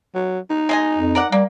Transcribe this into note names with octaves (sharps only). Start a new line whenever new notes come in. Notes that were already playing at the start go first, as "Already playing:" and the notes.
F#3
D#4
G#3 D#5 G#5
F2
A#4 D5 F#5
G3 A#3